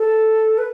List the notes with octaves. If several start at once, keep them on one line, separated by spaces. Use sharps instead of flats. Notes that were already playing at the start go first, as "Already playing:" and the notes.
Already playing: A4
B4